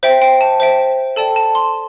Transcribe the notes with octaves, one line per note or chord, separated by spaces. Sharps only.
C5 E5 G5
G5
A5
C5 E5 G5
A4 D5 G5 A5
A5
C6